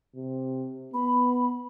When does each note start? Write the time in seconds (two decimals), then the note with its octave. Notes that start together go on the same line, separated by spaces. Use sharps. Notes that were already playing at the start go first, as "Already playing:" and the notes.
0.16 C3
0.94 B3 B5